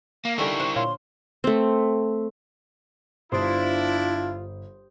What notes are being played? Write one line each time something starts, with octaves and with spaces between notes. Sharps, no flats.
A#3 F5
D3 G3 C#4 D#4 E4 A4 A#4 C#6
C5 F#5
A#2 C#5 F5 C6
A3 C4
G1 D4 E4 F4 G4 C5 D#6